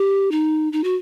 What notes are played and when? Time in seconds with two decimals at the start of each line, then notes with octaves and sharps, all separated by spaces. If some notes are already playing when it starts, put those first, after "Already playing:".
Already playing: G4
0.31 D#4
0.73 D#4
0.84 F#4